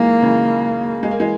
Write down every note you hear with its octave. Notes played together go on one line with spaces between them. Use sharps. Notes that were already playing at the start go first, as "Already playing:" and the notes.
Already playing: D#3 E3 F#3 G#3 A#3
C#3 E3
G#3
A#3
E3 G#3